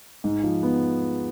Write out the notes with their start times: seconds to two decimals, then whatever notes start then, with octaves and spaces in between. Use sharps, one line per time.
0.24 G#2
0.44 F3
0.63 B3